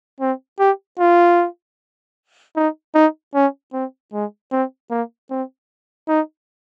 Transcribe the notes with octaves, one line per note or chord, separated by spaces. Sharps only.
C4
G4
F4
D#4
D#4
C#4
C4
G#3
C4
A#3
C4
D#4